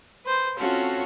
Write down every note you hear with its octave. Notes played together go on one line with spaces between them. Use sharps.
B4 C5
C4 C#4 F4 F#4 A4 C#5